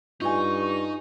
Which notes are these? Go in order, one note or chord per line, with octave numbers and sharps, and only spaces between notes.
G2 D#4 F4 G#5 C#6